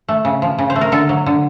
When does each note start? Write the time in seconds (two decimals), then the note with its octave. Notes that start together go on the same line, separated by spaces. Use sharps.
0.08 A3
0.25 C#3
0.42 F3
0.58 C#3
0.70 C5
0.76 A3
0.81 A#4
0.92 D3 A4
1.09 F#3
1.26 D3